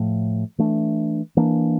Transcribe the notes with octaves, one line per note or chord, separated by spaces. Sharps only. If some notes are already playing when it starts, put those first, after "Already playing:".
Already playing: A2 F3 A3
E3 A3 D4
E3 A#3 D4